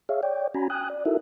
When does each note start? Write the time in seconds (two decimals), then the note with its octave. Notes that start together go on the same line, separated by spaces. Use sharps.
0.09 G#4 C#5 E5 F5
0.23 C#5 D5 G5
0.54 C#4 F#4 G#5 A#5 B5
0.70 G5 G#5 D#6 F#6
0.90 D5
1.05 D#4 E4 F#4 A4 A#4 E5